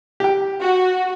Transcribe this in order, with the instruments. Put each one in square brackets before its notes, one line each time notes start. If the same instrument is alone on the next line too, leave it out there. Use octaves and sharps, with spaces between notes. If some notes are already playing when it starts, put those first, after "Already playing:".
[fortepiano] G4 G5
[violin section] F#4